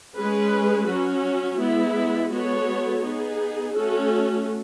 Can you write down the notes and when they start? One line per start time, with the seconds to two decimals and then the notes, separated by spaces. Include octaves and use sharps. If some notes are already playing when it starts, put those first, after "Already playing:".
0.16 G#3 C#4 G#4 B4
0.88 F#3 C#4 F#4
1.59 G#3 B3 E4
2.31 G#3 B3 F#4 A4 C#5
3.03 B3 D#4 G#4
3.75 A3 C#4 F#4 A4